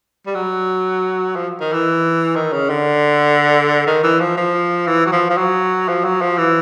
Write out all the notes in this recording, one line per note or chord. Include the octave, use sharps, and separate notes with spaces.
G3
F#3
F3
D#3
E3
D#3
C#3
D3
D#3
E3
F3
F3
E3
F#3
F3
F3
F#3
F3
F#3
F3
E3